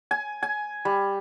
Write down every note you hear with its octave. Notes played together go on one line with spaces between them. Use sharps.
G#5
G#5
G3